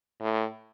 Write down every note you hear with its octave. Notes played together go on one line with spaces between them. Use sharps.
A2